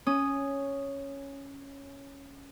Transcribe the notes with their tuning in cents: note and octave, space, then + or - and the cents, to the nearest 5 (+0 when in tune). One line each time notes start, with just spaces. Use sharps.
C#4 +0 D#6 -5